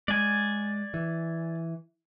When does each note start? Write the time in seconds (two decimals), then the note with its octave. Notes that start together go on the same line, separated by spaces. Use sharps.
0.08 G#3 D5 G#5
0.94 E3